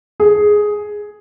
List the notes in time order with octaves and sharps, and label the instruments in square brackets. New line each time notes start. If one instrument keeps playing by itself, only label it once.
[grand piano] G#4